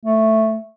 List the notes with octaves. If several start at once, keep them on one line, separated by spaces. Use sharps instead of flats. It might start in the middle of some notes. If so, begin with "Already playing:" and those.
A3